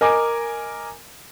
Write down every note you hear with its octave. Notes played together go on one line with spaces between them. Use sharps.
A#4 D#5 G#5 D6